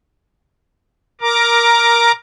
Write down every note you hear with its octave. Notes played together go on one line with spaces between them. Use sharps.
A#4 A#5 D6